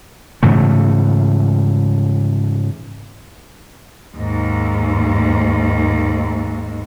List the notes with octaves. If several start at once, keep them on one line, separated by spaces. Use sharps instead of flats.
G#2 C#3 E3 A3
D#2 G#2